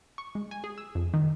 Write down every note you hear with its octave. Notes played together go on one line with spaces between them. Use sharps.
C#6
G#3
G#5
G#4
E6
F2
D#3